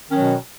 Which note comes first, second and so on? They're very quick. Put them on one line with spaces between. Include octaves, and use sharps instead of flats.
D#3 C#4 F#3 B2